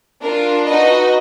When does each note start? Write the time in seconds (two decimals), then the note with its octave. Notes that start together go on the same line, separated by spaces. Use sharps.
0.20 D4 F4 A#4
0.66 D#4 F#4 B4 D#5